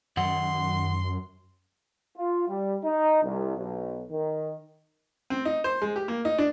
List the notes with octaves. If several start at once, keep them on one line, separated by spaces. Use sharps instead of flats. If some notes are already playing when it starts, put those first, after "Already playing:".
F#2 D#3 F#5 C6
F4
G3
D#4
C2
B1
D#3
C4
D#4
C5
G#3
G4
A#3
D#4
D4